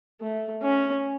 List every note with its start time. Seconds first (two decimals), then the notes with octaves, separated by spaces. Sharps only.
0.21 A3
0.62 C#4